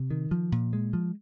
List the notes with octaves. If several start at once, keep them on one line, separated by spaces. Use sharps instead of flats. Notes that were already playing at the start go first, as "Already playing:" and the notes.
Already playing: C3
D#3
F3
A#2
G#3
F3